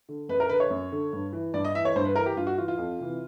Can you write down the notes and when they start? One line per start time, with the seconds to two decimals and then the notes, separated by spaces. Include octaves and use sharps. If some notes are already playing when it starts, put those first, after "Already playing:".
0.09 D3
0.29 F#2 B4
0.40 A#4
0.49 D3 B4
0.60 C#5
0.70 F#2
0.92 D3
1.13 G2
1.33 E3
1.54 G2 D5
1.65 D#5
1.75 E3 E5
1.85 C#5
1.96 G2 C5
2.05 B4
2.16 E3 A#4
2.26 G4
2.37 G2 F4
2.47 F#4
2.58 E3 F4
2.68 F4
2.78 F2
3.00 C3 E3